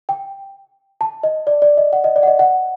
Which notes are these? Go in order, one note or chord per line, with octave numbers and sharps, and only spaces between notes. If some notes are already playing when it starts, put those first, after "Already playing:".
G5
A5
D#5
D5
D5
D#5
F#5
D#5
D5
F#5
D#5
F#5